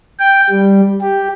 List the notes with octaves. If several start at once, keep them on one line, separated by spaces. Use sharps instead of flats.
G5
G3
G4